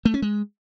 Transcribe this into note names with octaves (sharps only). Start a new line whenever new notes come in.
A3
C#4
G#3